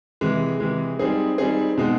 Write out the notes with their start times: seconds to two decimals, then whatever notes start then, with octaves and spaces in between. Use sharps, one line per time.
0.21 C3 E3 G#3
0.60 C3 E3 G#3
0.99 G3 C4 D#4 G#4
1.38 G3 C4 D#4 G#4
1.78 B2 G#3 C4 D#4